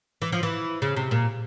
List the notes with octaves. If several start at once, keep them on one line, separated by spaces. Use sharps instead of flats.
E3
F3
E3
C#3
C3
A#2